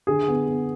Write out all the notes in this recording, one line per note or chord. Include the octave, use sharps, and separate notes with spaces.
D3 G#4
B3
B3